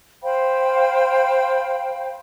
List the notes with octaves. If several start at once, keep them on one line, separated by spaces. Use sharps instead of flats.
C5 F5 G5 B5